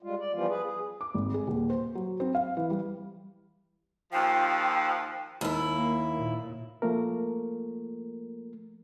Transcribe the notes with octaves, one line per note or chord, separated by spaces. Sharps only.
G3 G#3 F4
D5
E3 F3 G3 B3 F4
G#4 B4
G#4
D6
G#1
G#4
D#1
C5
F#3
C4
F5
E3
G3
D#2 F3 G5
D#2 E4
A#3
A#2
F3 A3 A#3 A#4